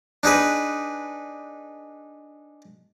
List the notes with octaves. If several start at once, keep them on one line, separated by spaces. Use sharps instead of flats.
D4 D#4 G#4 B4